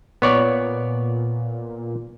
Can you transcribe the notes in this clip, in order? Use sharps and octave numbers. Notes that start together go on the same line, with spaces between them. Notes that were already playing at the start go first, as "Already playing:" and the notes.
A#2 B3 C#5 D5